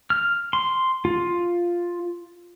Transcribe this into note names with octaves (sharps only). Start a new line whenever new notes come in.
F6
C6
F4